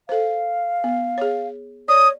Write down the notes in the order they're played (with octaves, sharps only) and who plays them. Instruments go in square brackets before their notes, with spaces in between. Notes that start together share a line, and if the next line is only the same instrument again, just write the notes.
[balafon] A4 C5 [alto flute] F5
[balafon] B3
G#4 C#5
[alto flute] C#5 [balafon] D5 [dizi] D#6